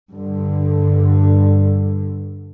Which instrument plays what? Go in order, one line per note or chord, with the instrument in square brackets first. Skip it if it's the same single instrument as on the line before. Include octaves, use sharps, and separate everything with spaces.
[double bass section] G2 D3